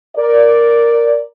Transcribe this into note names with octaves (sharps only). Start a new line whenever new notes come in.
A#4 D5